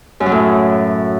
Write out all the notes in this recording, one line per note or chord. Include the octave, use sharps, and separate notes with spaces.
F#2
F#3
A2